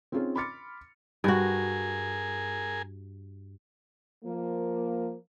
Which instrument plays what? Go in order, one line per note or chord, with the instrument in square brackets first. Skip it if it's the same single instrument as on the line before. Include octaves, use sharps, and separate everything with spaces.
[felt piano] C4 C#4 D#4 F4 G#4 C#5
B5 C6 D6 F6 A6 C#7
[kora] G2 F#4 [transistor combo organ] G#4 A#4 G#5
[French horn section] F3 A#3